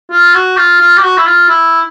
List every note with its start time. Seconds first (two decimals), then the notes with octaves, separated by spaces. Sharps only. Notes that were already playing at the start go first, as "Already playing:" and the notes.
0.11 F4
0.35 F#4
0.57 F4
0.80 F4
0.97 G4
1.03 F#4
1.17 E4
1.26 F4
1.48 E4